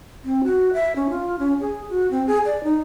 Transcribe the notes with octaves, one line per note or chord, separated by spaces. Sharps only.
C4
F#4
E5
C#4
F4
C#4
G#4
F#4
C4
G#4
D5
D#4